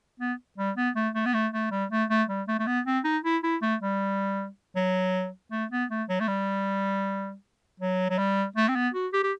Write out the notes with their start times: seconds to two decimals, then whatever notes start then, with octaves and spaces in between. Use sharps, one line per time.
0.20 B3
0.58 G3
0.77 B3
0.96 A3
1.15 A3
1.26 B3
1.34 A3
1.53 A3
1.71 G3
1.91 A3
2.10 A3
2.29 G3
2.48 A3
2.59 A3
2.67 B3
2.86 C4
3.04 D#4
3.24 E4
3.43 E4
3.62 A3
3.81 G3
4.76 F#3
5.52 A3
5.71 B3
5.90 A3
6.09 F#3
6.20 A3
6.28 G3
7.80 F#3
8.10 F#3
8.18 G3
8.56 A3
8.68 C4
8.75 B3
8.94 F#4
9.13 G4
9.23 G4